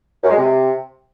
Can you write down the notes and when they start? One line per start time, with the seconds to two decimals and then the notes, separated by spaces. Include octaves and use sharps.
0.22 F#2
0.30 G#3
0.38 C3